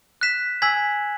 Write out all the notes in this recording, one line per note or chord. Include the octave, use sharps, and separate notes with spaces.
F#6 B6 E7
G#5 E6 G#6 B6 F#7